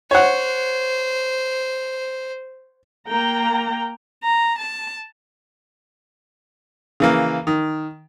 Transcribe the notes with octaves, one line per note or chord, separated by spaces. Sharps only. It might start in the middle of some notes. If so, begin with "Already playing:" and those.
C5 C#5 F#5
A#3 G5 A#5
A#5
A5
C#3 E3 A#3
D#3